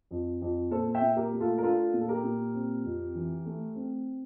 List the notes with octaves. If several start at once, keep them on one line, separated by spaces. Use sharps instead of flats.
F2
F2
A#2 A4 C5
E5 G5
A#2
G4 A#4
A3
F4 A4
A#4
D4 F4 A4
A#2
A4
G4 A#4
A#2
C4
F2
E3
A3
C4